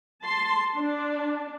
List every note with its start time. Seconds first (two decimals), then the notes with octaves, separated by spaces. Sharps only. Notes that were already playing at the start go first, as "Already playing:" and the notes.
0.22 A5 C6
0.78 D4